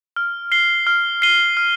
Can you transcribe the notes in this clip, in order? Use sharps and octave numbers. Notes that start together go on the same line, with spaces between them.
F6
C7 G7
F6
C7 D#7 G7
F6